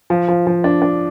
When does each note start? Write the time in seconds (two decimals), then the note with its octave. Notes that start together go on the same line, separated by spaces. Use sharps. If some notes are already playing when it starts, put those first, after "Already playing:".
0.10 F3
0.28 F3
0.47 F3
0.64 D4
0.82 D4